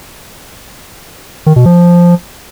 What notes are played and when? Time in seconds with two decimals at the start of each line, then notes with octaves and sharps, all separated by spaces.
1.46 D#3
1.56 B2
1.66 F3